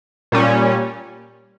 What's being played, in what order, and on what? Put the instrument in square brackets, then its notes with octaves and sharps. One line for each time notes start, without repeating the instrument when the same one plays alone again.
[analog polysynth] A#2 G3 C#4